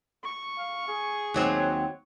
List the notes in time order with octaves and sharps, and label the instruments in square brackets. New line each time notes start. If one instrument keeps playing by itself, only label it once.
[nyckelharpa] C#6
[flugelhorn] F5
G#4
[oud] D#2 F#3 C4